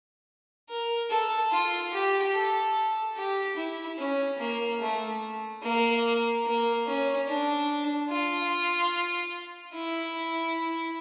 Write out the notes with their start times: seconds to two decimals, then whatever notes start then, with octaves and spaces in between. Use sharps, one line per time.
0.69 A#4
1.10 A4
1.51 F4
1.93 G4
2.34 A4
3.17 G4
3.57 E4
3.99 C#4
4.39 A#3
4.80 A3
5.63 A#3
6.46 A#3
6.87 C#4
7.28 D4
8.10 F4
9.74 E4